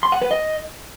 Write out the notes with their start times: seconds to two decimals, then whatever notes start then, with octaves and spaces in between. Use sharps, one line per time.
0.03 C6
0.12 F#5
0.22 B4
0.31 D#5